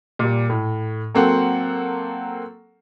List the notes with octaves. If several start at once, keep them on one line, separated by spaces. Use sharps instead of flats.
A#2 G3
A2
F#3 A#3 C4 A4 F#5